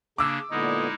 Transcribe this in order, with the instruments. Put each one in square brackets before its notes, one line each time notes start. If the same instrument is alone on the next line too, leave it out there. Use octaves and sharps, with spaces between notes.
[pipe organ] C#3 A#3 D4 [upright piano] D6 E6
[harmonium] A#2 D3 B3 [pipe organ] G#3 D#4 E4 [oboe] D#5